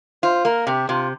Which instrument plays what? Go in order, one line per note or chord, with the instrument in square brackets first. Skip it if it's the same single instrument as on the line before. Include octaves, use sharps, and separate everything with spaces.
[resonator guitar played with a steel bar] F4 [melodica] C5
[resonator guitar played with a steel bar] A#3 [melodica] A#4
[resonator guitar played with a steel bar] C3 [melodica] G4
[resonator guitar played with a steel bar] C3 [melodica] F4